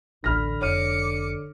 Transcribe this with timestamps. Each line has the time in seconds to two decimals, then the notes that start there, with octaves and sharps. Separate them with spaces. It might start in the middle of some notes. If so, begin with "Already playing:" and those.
0.24 A1 D2 D3 B5 F6 A#6
0.61 F1 C#5 D6 F6 C#7 D#7